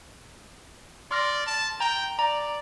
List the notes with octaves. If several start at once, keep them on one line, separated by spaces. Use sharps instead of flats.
D5 C6 F6 A#6
A5
G5 A#5
D5 A#5